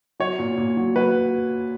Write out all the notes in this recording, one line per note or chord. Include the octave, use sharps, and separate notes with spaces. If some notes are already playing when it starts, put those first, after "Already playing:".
F#3 C#5
A#2
A#2
F#3
F#3 B4